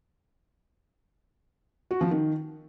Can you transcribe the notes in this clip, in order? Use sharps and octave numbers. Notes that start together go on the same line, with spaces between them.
F#4
F3
D#3